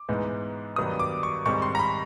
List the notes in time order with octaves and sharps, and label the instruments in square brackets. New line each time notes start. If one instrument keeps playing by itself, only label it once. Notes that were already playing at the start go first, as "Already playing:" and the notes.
Already playing: [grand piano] D6
G#2 E3 G#3 B3 D#4
G2 D#3 F#3 B3 D#6
D6
C#6
G#2 D#3 G3 C4 C#6
C6
A#5
B5